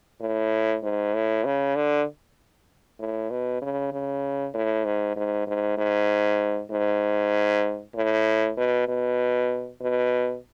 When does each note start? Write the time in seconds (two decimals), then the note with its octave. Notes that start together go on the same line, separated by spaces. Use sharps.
0.20 A2
0.83 G#2
1.14 A2
1.45 C#3
1.76 D3
2.99 A2
3.30 B2
3.62 C#3
3.93 C#3
4.54 A2
4.85 G#2
5.16 G#2
5.47 G#2
5.78 G#2
6.71 G#2
7.95 A2
8.57 B2
8.88 B2
9.81 B2